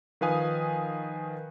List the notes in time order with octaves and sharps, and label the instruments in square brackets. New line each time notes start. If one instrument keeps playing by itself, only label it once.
[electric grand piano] D#3 F3 B4 F5 G#5 D#6